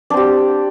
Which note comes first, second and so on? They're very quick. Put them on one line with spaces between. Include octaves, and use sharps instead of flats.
D4 C4 G4